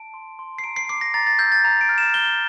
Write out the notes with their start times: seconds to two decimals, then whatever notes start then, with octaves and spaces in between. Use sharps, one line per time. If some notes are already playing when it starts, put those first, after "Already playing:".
Already playing: A5 D7
0.14 C6
0.39 C6
0.58 C7
0.64 A#5 D7
0.76 C7
0.89 D6 C7
1.01 A#6
1.14 A#5 A6
1.27 A6
1.39 E6 G6
1.52 A6
1.64 A#5
1.81 D7
1.89 F6
1.98 E7
2.14 G6 G7